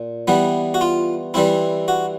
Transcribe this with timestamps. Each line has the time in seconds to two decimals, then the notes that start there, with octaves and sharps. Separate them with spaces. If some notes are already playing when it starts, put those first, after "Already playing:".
Already playing: A#2
0.28 E3 G3 B3
0.74 F#4
0.81 F4
1.34 E3 G3 C4 E4
1.88 F#4